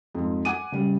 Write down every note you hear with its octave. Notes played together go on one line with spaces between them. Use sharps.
F2 G#2
F#5 G#5 D6 D#7
C#3 G3